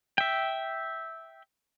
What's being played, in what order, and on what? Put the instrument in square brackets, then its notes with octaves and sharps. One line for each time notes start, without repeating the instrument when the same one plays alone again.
[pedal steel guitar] E5 G5